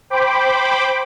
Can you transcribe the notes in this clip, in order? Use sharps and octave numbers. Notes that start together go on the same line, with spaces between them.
C5 G5 B5 D6